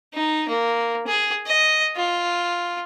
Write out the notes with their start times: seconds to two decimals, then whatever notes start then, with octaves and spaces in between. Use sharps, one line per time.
0.14 D#4
0.48 A#3
1.07 G#4
1.46 D#5
1.96 F4